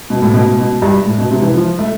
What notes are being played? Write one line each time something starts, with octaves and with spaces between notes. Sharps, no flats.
B2
A2
B2
B2
G2
A2
B2
C3
E3
F3
A3